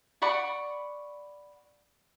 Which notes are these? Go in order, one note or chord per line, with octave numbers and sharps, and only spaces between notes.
D5 F#5 B5 C#6